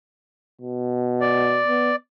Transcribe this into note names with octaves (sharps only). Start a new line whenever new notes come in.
B2
D5
B3